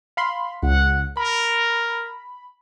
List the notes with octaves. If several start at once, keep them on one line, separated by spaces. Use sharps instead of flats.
F5 B5 C6
C#2 F#5
A#4 B5